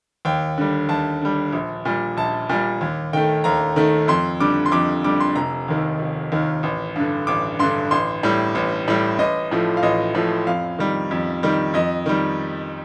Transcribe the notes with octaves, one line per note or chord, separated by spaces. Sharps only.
D#2 G5
D3 G3
D#2 A5
D3 G3
A#1
A#2 G3
A#1 A5
A#2 G3
D#2
D#3 A3 G5
D#2 A#5
D#3 A3
F2 C6
D3 G3 D6
C6
F2 D6
D3 G3 D6
C6
F1 A#5
D#2 D#3
F1
D#2 D#3
A1
G2 D3
A1 D6
G2 D3 C6
A1 C6
A2 G3
A1
A2 G3
A1 D#5
A2 F3 A3
F5
A1 D#5
A2 F3 A3
F2 F5
D#3 G3
F2
D#3 G3
F2 D#5
D#3 G3